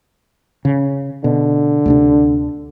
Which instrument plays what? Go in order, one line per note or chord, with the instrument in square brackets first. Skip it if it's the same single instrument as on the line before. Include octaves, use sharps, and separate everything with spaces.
[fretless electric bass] C#3
[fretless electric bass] B2 [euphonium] D3
[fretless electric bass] D2 C3 D4